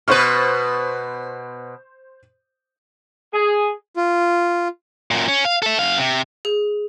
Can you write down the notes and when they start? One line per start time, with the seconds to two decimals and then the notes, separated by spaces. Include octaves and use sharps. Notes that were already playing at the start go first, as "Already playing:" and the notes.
0.08 B2 B4 C5 C#6 F6
3.34 G#4
3.97 F4
5.11 F#2 A#2
5.28 C#4
5.45 F5
5.62 A4 E5
5.78 F#2 F5
5.98 C3
6.45 G#4